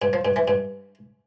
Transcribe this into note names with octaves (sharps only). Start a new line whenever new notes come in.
G2
F3
G2
E3
G2